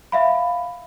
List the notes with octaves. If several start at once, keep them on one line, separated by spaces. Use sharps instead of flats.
E5 F5 B5